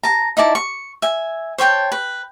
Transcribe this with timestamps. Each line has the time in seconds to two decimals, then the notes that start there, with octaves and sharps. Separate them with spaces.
0.03 A5 A#5
0.37 D#4 E4 D5 A5
0.55 C#6
1.02 E5 G#5
1.58 C5 C#5 G5 A5
1.92 B4